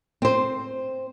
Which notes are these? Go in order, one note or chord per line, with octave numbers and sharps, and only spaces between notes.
C4 C5